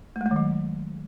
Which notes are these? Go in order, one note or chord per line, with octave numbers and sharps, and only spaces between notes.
A3
G#3
A3
D#3
F#3